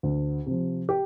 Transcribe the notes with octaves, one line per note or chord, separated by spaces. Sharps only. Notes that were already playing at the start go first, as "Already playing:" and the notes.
D2
C3 F3
G4